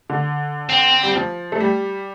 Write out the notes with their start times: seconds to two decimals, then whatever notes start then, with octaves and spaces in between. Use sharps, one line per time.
0.10 D3
0.70 C4
1.03 G3
1.15 F3
1.52 A3
1.60 G3